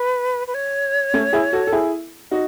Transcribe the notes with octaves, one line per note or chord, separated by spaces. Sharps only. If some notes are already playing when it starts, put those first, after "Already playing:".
Already playing: B4
B4
C#5
A3 C#4
E4 G#4
F#4 A4
A4
E4 G#4
D#4 F#4